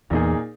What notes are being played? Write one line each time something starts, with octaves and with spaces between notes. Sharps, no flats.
E2 A#2 A#3 D#4 G#4